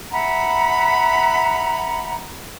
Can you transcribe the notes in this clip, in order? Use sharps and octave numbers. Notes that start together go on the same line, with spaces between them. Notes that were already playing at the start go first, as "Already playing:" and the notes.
E5 F#5 A#5 B5